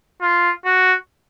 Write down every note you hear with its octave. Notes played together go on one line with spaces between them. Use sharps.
F4
F#4